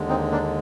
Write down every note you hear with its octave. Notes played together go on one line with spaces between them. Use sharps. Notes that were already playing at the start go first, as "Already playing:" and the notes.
Already playing: D#2 D3 G#3
C4 D#4
A#3 D4